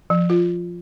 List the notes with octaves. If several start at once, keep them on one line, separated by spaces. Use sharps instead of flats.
F3
F4